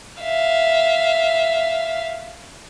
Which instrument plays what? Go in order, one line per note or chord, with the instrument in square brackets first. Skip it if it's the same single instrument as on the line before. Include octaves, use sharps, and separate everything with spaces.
[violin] E5 F5